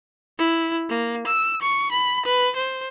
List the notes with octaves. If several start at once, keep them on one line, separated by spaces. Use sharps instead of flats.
E4
A#3
E6
C#6
B5
B4
C5